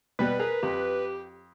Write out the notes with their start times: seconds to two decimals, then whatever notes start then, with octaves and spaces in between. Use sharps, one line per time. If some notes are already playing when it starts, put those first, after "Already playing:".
0.19 B2 G3 B3 B4
0.40 G#4 A#4
0.63 F2 G4